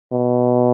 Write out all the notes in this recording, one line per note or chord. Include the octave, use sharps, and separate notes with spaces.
B2